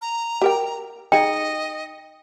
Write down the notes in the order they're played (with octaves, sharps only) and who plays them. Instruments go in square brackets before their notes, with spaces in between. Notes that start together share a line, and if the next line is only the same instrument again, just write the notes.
[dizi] A#5
[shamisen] G4 A#4 G5
[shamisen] D#4 G#4 [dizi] D#5 [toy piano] G5